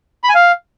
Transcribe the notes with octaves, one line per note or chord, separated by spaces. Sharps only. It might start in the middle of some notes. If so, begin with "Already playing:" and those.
B5
G#5
F5